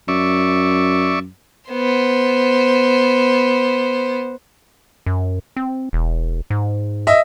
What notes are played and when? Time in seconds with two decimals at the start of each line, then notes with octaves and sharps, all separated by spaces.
0.08 F#2 D5 E5 C#6
1.71 B3 C5
5.06 F#2
5.56 C4
5.93 E1
6.50 G#2
7.07 D#5 E5